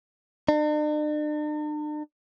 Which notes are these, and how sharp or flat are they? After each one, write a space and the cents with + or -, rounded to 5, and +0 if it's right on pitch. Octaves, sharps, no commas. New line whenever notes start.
D4 +45